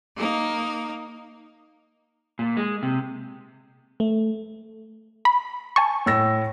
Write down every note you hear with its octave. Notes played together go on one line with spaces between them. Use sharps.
A#3 D#4
A#2
G#3
C3
A3
B5
G#5 A5 C#6
A2 E6 A#6